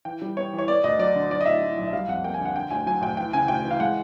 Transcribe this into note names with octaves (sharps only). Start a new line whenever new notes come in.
E3 G5
G3
B3 C#5
E3
C#5
B3 D5
D2 D#5
F#3 D5
D3
F#3 D5
D#5
A2 E5
A2
B1
E5
G3 F5
F2 F#5
A#3 G5
G#5
D3
F#5
D3 G5
D2 G#5
F#3 G#5
D2 G5
E3 G5
C#3 G#5
D2 G5
E3
F5
G#3 F#5